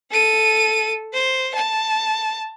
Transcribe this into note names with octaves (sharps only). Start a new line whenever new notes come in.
A4 D#7
C5
A5